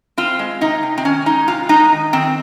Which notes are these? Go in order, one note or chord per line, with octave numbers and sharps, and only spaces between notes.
C4 F4
G#3
C3 D#4
C3
C4
D#3 C#4
G#3 D#4
C3 F4
G#3 D#4
D#3
D#3 C4